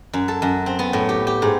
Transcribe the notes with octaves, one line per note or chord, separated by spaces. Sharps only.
F#2
A4
F#2
C4
B3
A2
G4
G4
G#2